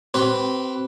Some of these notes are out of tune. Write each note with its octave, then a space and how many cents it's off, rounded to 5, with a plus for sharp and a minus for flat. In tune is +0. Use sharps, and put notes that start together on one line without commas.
C4 +0 G4 -40 B4 +0